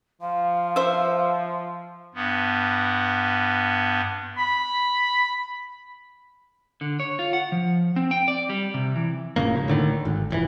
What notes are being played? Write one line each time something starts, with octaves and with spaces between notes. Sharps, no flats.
F3 F5
C5 E5
G2 B3
B5
D3
C#5
F4
F#5
F3
C4
G5
D5
G3
C3
E3
F1 A2 C#3 A#3
G2
A2 D3 D#3
G#1
F1 G#2 E3